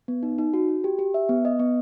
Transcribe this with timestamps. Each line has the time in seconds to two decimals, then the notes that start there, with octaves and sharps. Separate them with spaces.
0.08 B3
0.23 D#4
0.38 D#4
0.53 F#4
0.68 F#4
0.84 G4
0.99 G4
1.14 E5
1.29 B3
1.45 D#5
1.59 B3